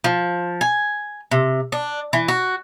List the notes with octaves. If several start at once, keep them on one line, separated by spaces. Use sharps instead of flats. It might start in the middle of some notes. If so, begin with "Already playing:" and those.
F3
G#5
C3
D4
E3
F#4